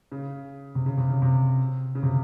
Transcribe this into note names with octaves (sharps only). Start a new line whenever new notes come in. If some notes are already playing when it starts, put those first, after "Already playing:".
C#3
C3
C#3
C3
C#3
C3
C#3
C3